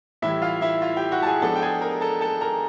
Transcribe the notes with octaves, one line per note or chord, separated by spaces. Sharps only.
A2 E3 G3 E4 E5
F4 F5
E4 E5
F4 F5
G4 G5
F#4 F#5
A5
G#4 G#5
F3 G#3 B3 D4 A4 A5
G5
G#4 G#5
A#4 A#5
A4 A5
A4 A5
A#4 A#5